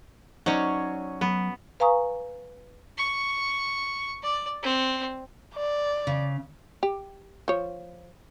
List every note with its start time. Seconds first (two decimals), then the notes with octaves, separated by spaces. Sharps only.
0.46 F#3 C#4 D#4 C5 D5
1.21 F#3 B3
1.80 B4 F5 G#5 A#5 C#6 D#6
2.98 C#6
4.23 D5
4.63 C4
5.56 D5
6.07 C#3
6.83 G4
7.48 F3 C#5